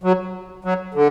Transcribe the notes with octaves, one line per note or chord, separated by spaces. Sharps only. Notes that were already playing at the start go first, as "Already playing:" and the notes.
F#3
F#3
D3